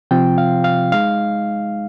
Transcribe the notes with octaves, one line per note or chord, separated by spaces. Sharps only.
C3 F3 C4 F4 G5
F5
F5
G#3 D#4 F5